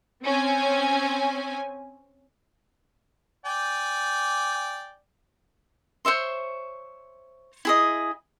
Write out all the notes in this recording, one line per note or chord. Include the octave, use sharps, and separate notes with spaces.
C4 C#4 G#5
D5 G5 G#5
C5 C#5 E5 C6
E4 G#4 D#5